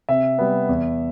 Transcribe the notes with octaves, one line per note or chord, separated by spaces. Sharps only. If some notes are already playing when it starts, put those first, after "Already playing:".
C3 E5
G3 B3
E2